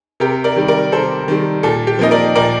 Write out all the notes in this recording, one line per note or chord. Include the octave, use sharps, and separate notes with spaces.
C3 G4 A#4
A#4 D5
D#3 G3
A#4 D5
C3 A4 C5
D#3 G3
A#2 A4
G4
F3 A#3 D#4 D#5
A#4 D5
A#2 A#4 D5